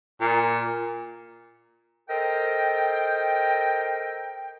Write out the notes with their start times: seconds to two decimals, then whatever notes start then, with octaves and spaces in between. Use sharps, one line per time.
0.21 A#2
2.10 A4 A#4 C5 D#5 G5